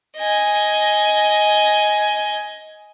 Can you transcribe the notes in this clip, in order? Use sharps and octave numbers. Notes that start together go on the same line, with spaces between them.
D#5 G#5